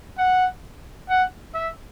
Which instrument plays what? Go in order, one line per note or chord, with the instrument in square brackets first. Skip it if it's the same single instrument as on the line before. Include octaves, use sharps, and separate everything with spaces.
[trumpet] F#5
F#5
E5